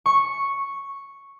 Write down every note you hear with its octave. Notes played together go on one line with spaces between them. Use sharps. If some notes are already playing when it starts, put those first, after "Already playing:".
C#6